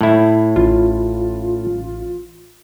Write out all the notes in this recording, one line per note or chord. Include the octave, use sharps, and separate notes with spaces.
A2 E4
A1 F4